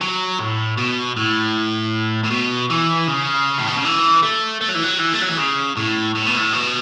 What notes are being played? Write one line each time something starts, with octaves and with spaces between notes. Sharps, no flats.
F#3
A2
B2
A2
A2
B2
E3
C#3
A2
B2
C#3
E3
A3
A3
F#3
E3
F#3
E3
A3
F#3
E3
C#3
A2
A2
B2
A2
B2